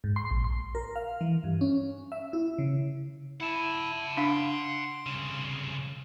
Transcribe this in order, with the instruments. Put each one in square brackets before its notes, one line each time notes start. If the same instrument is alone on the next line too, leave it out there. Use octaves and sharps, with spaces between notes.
[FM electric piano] G#2
C6
A#1
C6
A#4
F5
E3
G2
C#4
E5
E4
C#3
[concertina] E4 [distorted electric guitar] F#5 A5
[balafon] D4 F5 [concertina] C6
[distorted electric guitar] C2 C#3